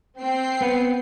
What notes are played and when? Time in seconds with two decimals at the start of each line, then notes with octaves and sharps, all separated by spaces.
0.19 C4 G5 C7
0.61 B3 B4 F#5